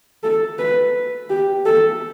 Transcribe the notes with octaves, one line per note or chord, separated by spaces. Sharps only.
A4
B4
G4
A4